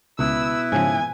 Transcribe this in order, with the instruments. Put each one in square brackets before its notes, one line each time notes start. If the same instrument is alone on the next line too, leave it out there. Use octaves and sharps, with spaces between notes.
[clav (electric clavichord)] C#2 [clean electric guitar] B2 [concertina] E4 B4 [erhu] E6
[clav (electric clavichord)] G#2 C#3 F3 [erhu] G#5